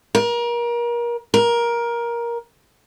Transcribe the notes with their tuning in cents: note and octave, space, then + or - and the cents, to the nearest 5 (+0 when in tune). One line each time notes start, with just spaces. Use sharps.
A#4 +30
A#4 +15